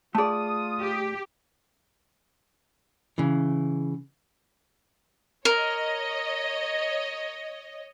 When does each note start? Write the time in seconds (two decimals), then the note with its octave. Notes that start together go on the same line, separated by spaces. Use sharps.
0.15 A3 F4 G#4 D5 A5 D#6
0.80 G4
3.18 C#3 E3
5.45 A#4 C#5 D#5